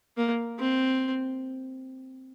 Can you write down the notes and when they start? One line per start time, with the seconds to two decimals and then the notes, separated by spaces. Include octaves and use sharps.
0.17 A#3
0.59 C4